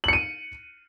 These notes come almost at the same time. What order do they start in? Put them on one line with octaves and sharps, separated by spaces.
F#7 C#7 D#7